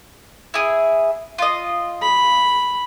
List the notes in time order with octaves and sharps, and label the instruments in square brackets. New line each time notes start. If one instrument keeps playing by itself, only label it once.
[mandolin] E4 G#4
F4 D#5
[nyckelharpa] B5